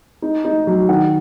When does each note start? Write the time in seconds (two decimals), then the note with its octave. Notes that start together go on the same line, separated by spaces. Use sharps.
0.22 D#4
0.45 D#4
0.67 F#3
0.89 D#3 F#5